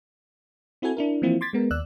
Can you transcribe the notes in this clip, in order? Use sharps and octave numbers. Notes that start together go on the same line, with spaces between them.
C4 E4 F#4 A4 G#5
D4 E4 A#4
E3 F3 A#3 C4 E4 F4
C6 D6 G#6 A6 B6
G#3 B3 A#4
D#2 D5 E6 F#6